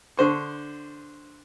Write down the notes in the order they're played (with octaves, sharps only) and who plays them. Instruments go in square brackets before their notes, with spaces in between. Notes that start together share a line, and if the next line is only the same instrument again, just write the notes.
[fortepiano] D3 C5 C#6